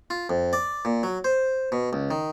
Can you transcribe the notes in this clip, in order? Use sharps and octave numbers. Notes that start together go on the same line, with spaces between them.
F4
F2
D5
A#2
F#3
C5
B2
C#2
D#3